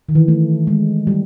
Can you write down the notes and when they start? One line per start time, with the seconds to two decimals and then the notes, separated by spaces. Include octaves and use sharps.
0.09 D#3
0.15 E3
0.28 A3
0.67 G#3
1.07 G3